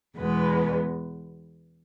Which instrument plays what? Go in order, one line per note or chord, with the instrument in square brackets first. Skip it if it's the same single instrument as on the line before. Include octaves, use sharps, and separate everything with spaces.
[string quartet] E2 B2 G#3 B3 B4